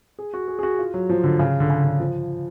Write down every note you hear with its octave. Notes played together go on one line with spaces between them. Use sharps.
G#4
F#4
G#4
G#4
F#4
F4
F#3
F3
D3
C#3
D3
C#3
D3
F3